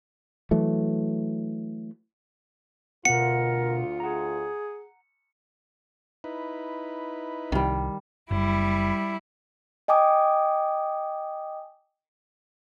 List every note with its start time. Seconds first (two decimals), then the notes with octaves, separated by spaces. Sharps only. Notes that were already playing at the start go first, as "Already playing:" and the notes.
0.51 E3 F#3 A3
3.05 D2 B2 F4 A#4 F#5 C#7
4.00 G#4 F#5 A#5
6.24 D#4 E4 B4
7.52 C2 D#3 G3
8.31 F#1 G3 E4
9.88 D#5 G5 G#5 D6 D#6